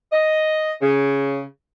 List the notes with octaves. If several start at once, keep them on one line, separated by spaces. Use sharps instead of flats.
D#5
C#3